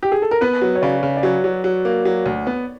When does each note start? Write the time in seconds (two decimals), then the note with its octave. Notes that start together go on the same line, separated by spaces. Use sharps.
0.03 G4
0.12 G#4
0.22 A4
0.31 A#4
0.41 B3 B4
0.62 F#3
0.75 C#5
0.82 C#3 D5
1.03 C#3
1.17 D5
1.23 F#3 C#5
1.44 F#3
1.64 F#3
1.85 A#3
2.05 F#3
2.26 D2
2.47 B3